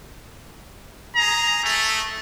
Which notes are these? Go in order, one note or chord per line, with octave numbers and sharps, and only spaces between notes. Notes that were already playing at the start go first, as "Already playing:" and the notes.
G#4 A#5
A3